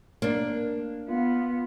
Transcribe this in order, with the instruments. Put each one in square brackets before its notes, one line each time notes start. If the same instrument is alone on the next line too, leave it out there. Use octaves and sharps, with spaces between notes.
[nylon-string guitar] A#3 D4
[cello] B3 [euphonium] F4